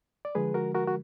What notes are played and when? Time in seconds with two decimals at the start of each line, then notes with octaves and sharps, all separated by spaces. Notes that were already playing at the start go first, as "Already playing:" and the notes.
0.25 D5
0.35 D3 F3 G#3 G#4 B4
0.54 F#4 A#4
0.74 F#4 A#4
0.88 F#4